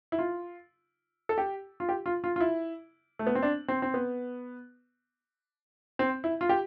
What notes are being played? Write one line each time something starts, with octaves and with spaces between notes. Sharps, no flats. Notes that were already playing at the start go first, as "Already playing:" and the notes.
E4
F4
A4
G4
F4
G4
F4
F4
F4
E4
A3
B3
C4
D4
C4
C4
B3
C4
E4
F4
G4